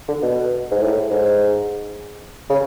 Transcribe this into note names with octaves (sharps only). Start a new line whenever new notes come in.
D3
B2
G#2
A2
G#2
C#3